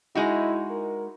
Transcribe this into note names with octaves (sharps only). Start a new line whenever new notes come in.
G#3 D#4 E4 F#4
A#4